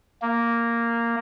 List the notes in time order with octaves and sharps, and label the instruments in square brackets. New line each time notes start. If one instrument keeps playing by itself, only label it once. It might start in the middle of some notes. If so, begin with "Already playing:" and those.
[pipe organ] A#3